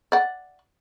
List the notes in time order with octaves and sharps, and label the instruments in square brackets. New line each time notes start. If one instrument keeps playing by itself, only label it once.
[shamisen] D5 F#5